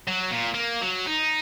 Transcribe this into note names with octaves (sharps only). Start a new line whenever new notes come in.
F#3
A#2
A#3
F#3
D#4